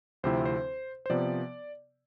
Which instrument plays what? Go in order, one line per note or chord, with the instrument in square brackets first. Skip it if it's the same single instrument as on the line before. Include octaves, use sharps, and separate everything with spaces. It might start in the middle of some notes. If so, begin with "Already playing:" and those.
[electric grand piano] D2 C3 F3 C4 E4 C5
C5
C5
C3 F3 B3 D5